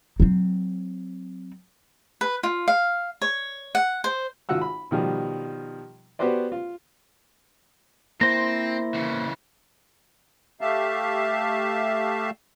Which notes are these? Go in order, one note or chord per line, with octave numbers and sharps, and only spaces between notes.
F#3 C4
B4
F4
F5
C#5
F#5
C5
G#1 F4 F#4 F#5 E6
B5
B2 D#3 F3 G3
B3 F#4 G4 B4 C5 D5
F4
A#3 C4 E4 C5 A#6
C#3 E3
A3 G4 E5 F5 A5